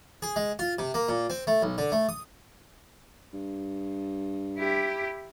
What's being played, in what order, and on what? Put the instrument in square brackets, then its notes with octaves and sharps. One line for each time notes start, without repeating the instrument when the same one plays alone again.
[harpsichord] G#4
G#3
F4
C3
A#3
A#2
C4
A3
B1
D3
A3
D#6
[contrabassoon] G2
[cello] E4 G4